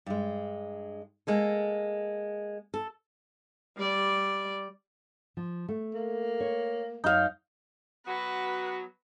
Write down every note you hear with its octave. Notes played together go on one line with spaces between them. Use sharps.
G2 G#3
G#3 A#3 A4
A4
G3 D5
F3
A3
A#3
C#5
F#2 D#4 F#4 C#5 F5
F#3 B3 F#4 B4